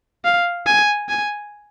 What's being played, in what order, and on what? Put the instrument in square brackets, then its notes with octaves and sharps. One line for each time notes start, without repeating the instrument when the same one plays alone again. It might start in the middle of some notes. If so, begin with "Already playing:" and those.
[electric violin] F5
G#5
G#5